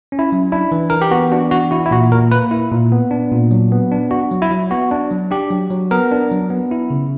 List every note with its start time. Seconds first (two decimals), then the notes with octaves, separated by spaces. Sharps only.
0.12 C#4
0.19 E4
0.32 F#3
0.52 D4 E4
0.72 E3
0.90 E3 A#4
1.02 G4
1.11 B3 F#4
1.32 D4 F#4
1.51 E3 F#4
1.71 E4 F#4
1.86 E4
1.91 A#2 F#4
2.12 A#2 A#4
2.31 A#3 B4
2.51 E4
2.72 A#2
2.92 B3
3.11 D4
3.31 A#2
3.51 F#3
3.72 B3
3.92 D4
4.11 D4 F#4
4.31 F#3
4.42 E4
4.51 F#3
4.71 B3 F#4
4.91 D4
5.11 F#3
5.31 D4 G4
5.51 F#3
5.71 F#3
5.91 B3 A#4
6.12 D4
6.32 F#3
6.50 B3
6.71 E4
6.90 C#3